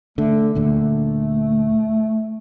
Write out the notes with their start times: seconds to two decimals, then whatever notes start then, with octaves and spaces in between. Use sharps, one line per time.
0.18 D3 A3
0.55 D2 A#2 D3 A3